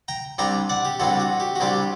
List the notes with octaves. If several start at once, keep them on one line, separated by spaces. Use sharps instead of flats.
G5 A#5
C2 C3 G3 D4 G5 A#5
D5 F#5
G4
C2 C3 G3 D4 F#4 A4
F#4
G4
F#4
C2 C3 G3 D4 G4